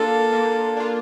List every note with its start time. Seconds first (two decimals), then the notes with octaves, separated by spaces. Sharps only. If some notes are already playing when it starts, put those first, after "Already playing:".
Already playing: A#3 D4 F4 A4
0.33 A#3
0.77 D4 F4